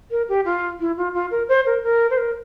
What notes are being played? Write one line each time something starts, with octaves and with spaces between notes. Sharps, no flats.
A#4
G4
F4
E4
F4
F4
A#4
C5
A#4
A#4
C5
A#4